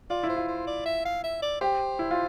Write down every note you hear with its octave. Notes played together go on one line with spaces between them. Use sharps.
F4 D5
E4
C5
F4
C5
D5
E5
F5
E5
D5
G4 C5
E4
F4